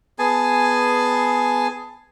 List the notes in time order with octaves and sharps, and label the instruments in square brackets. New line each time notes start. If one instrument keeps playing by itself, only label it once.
[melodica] B3 G#4 G#5 A5